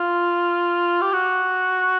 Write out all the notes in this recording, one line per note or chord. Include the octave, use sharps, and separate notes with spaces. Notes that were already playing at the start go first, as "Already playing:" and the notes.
Already playing: F4
G4
F#4